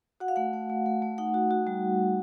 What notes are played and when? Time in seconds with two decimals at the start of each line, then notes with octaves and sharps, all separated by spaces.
0.20 F#4 F#5
0.28 F5
0.36 A3 F#5
0.53 A3
0.69 A3
0.86 A3
1.02 A3
1.18 D#4 F#5
1.34 F#4
1.51 F#4
1.67 G3